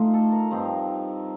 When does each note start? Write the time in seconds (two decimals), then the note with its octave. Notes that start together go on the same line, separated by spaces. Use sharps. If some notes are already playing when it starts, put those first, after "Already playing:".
Already playing: A2 A3 D#4 F4
0.14 A4
0.32 A#4
0.51 G2 F3 C4 D#4